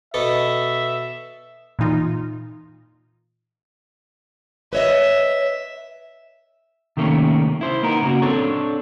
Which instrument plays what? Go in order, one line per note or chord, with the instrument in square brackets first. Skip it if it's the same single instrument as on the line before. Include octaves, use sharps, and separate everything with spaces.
[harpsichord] B2 B3 A4 [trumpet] E5
[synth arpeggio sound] A#2 E3 D#4 F4
[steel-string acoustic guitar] B4 C#5 D#5 [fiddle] E5
[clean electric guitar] C3 D#3 A3 A#3 C#4
E4 C5
A#3 B3 D#4 A#4
C#3 A#3 F#4
C4 D4 A4 C#5